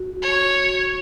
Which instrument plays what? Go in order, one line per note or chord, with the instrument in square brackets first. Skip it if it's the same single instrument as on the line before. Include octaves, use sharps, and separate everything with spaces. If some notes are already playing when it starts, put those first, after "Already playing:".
Already playing: [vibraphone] F#4
[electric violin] C#5